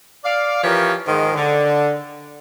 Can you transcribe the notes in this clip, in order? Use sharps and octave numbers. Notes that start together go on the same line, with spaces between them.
D5 F5
E3 F3 C#4 G4 A#4 C#5
G#2 D#3 F3 G#3
D3